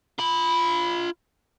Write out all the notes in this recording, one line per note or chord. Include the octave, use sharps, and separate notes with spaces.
F4 B5